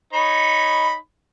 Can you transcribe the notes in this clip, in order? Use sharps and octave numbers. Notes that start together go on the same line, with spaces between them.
D#4 C#5 B5